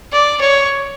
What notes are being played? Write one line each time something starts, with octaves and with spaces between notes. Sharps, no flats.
D5
C#5